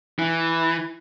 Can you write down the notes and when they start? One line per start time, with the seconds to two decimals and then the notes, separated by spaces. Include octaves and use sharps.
0.19 E3